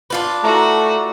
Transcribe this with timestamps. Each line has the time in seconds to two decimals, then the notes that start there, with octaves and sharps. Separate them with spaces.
0.10 D4 F4 B4
0.44 A3 E4 F#4 A5 A#5